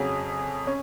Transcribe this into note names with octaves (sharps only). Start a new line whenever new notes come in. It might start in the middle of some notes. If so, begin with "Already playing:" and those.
Already playing: F2 C#3 F#3 G#5
C#4